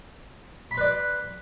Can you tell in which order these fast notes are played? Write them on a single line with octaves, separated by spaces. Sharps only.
B5 C6 B4 D5